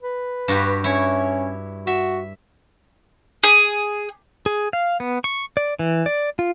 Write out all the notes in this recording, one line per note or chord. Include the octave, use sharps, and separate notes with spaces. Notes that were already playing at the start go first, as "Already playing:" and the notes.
B4
G2 F#4 G4
C#4 E4 C#5
F#4 E5
G#4
G#4
F5
B3
C#6
D5
E3
D5
F4